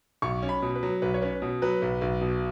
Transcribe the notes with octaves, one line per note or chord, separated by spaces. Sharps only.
B1 C#6
C#4
B5
B2
B4
F#3
B1 B4
C#5
C#4 B4
B2
F#3 B4
B1
B1
B2